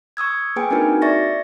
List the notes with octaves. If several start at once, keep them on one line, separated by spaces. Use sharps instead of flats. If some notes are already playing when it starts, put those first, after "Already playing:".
C#6 D#6 E6 G#6
A#3 G#4 B4 G5 G#5
C4 D4 D#4 F#4 A#4 B4
D5 E5 C#6 A6 A#6